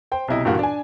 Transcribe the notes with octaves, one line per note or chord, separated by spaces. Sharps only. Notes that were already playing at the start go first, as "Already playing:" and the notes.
C5 G5
B1 C3 E4 D#5
G2 A#2 E3 G3 F4 F#4
D4 G#5